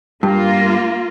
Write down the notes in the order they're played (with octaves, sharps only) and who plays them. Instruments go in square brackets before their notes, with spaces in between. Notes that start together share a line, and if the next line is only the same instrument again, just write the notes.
[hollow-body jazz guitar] G2 [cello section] A#3 F4